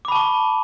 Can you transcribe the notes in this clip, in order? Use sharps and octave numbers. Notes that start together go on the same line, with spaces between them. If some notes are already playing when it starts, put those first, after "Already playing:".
A5 B5 C#6 D6